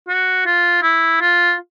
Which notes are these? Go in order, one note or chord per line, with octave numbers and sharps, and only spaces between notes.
F#4
F4
E4
F4